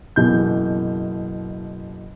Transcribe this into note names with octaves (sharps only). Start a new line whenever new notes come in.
F#1 B2 E3 G6